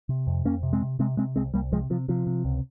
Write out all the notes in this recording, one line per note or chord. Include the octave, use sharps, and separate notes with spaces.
C3
F2
F2 A#3 C#4
C3
G#3 C4
C3
C3 G#3 C4
C3 G#3 C4
C2 G#3 C4
C2 G3 A#3
C3 F3 G#3
C3 F3
C3 F3
C3
C#2